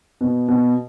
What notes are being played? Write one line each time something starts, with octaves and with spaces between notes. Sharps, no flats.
B2
B2